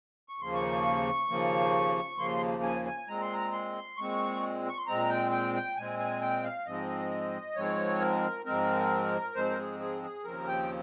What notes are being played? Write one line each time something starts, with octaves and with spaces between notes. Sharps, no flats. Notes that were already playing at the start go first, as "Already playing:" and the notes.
C#6
D#2 C#3 F3 A#3 C6
C#6
D#2 C#3 F3 A#3
D#2 C#3 F3 A#3 C6
G#5
G#5
A#2 G#3 C4 A#5
C6
A#5
C6
A#2 G#3 C4 C#6
C#6
C6
A#2 G#3 C4 A#5
G5
G5
G5
A#2 G#3 C4 G#5
G#5
G5
F5
G#2 F3 G#3 C4 D#5
G#2 F3 G#3 C4 C#5
A#4
G#2 F3 G#3 C4 A#4
G#2 F3 G#3 C4 C5
A#4
G#4
G#4
G#4
D#2 C#3 F3 C4 A#4
G5